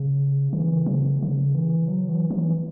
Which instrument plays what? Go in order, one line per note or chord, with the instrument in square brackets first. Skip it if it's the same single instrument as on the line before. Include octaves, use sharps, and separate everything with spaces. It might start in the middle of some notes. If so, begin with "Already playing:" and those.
Already playing: [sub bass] C#3
C#3
E3
E3
C#3
C#3
E3
F#3
E3
E3